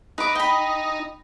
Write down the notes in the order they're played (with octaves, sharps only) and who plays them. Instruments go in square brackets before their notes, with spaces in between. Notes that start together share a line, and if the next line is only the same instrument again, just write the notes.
[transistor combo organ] D#4 [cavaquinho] B4 D6
[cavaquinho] G5 B5